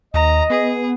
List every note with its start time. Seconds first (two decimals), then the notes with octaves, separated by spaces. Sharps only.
0.14 D#2 D#5 A#5
0.50 B3 G#4